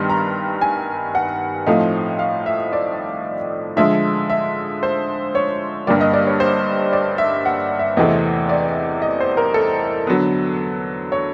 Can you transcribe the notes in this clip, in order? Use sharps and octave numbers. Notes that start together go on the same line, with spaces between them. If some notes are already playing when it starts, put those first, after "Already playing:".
Already playing: G2 D#3 G3 B3 C6
A#5
G#5
F#5
A2 F3 A3 C4 D#4 F5
F5
E5
D5
D3 F3 G#3 E5
E5
C5
C#5
G2 D3 G3 A#3 D5
D#5
D5
C#5
C5
D5
E5
F#5
E5
E2 C3 E3 A3 C4 D#5
D5
D#5
C5
A#4
A4
D3 F#3 B3
C#5